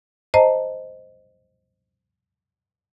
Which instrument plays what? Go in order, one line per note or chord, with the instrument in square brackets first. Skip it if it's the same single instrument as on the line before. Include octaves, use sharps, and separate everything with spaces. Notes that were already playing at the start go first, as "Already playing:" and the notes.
[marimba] C5 D#5 A5 A#5